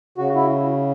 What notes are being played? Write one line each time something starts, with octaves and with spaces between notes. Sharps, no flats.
C#3 F#4
E4